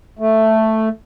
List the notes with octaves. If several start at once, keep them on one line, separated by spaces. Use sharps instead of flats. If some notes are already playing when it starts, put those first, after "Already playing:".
A3